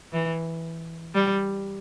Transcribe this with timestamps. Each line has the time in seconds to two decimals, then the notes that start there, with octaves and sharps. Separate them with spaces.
0.13 E3
1.15 G3